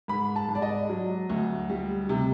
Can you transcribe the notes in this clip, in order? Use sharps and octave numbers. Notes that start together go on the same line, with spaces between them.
G#2 B5
A5
G#2
D5
D#5
F#3
D2
G3
C3